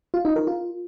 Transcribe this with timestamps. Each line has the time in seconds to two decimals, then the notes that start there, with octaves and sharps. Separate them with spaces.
0.14 F4
0.25 D#4
0.36 A#4
0.47 F4